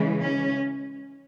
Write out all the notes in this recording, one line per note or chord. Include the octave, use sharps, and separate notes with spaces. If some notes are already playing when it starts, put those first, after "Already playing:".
Already playing: C#3 E3 G#3
C#4